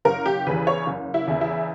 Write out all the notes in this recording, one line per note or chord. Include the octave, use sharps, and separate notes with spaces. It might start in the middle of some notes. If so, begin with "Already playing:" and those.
F#1 A#4
G4
E2 C#3 E3 B4
C#5
F#1
E4
E2 C#3 E3
E4